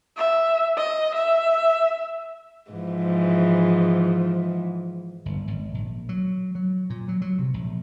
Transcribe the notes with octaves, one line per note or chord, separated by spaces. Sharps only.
E5
D#5
E5
G#2 E3 F3
G1
G#1
A#1
F#3
F#3
A#2
F#3
F#3
C3
A#1